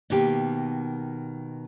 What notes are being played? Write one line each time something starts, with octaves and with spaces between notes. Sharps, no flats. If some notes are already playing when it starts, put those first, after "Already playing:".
B2 D#3 A#3 G4